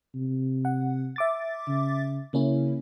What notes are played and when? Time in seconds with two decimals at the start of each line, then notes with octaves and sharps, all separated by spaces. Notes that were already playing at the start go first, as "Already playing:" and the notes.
0.15 C3
0.65 F#5
1.16 E5 D6 A6
1.67 C#3
2.34 C#3 A#3 C#4 E4